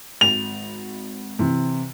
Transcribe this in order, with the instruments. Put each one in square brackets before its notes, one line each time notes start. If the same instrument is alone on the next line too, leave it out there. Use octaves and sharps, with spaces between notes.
[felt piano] G#1 [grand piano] F7
[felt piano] C3 E3